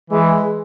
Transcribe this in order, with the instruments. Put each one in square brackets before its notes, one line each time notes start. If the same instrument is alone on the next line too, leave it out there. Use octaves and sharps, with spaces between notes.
[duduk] E3 [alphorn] G#3